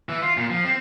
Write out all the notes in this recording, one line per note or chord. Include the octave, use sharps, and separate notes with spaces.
E3
F4
A#2
F3
C4